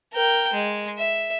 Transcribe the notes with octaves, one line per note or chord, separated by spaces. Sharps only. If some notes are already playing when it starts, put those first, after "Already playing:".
A#4 G5
G#3
E5